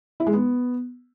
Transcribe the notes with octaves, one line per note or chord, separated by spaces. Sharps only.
E4
G#3
B3